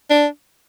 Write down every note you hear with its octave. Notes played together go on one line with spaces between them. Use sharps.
D4